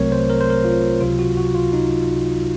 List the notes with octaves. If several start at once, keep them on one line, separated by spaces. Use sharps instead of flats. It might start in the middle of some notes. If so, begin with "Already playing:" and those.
Already playing: C2 C3 F#3 A3 C4 A#4 C#5
C5
A#4
C5
A#4
F4
C#2 C3 F#3 F4
F#4
F#4
F4
D#4